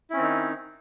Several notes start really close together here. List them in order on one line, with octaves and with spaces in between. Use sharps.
E4 C#4 C4 D#3 D#4